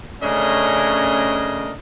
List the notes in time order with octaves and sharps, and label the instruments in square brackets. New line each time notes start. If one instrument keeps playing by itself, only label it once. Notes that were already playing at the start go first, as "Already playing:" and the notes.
[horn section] C#3 A3 C#4 D4 A#4 D#5